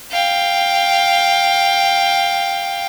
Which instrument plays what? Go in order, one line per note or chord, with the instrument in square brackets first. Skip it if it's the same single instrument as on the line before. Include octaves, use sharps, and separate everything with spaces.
[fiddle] F5 G5